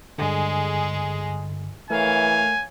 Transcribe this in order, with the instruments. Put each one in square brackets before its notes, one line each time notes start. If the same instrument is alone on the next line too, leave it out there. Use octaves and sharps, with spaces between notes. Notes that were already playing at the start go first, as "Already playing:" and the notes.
[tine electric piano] G2 D3 [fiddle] G#3 G#4
[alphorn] E3 [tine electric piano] A3 A#4 [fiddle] C#5 F5 [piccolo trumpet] G#5